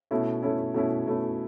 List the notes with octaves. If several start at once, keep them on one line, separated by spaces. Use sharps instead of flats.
B2 A3 C#4 E4
B2 A3 C#4 E4
B2 A3 C#4 E4
B2 A3 C#4 E4